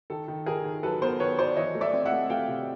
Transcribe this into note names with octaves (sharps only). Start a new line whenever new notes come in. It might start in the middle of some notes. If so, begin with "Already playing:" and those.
D#3 A4
D#3
D#3 G#4 A#4
D#3
F#3 A4 B4
B3 A#4 C5
D#3 B4 C#5
F#3 C5 D5
E3 C#5 D#5
A3
D5 E5
C4
E5 F#5
A3
A3 F5 G5
C3